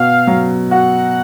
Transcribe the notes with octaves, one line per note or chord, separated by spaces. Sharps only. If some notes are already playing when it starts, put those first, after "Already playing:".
Already playing: B2 F#4 F5
F#3
F#4 F#5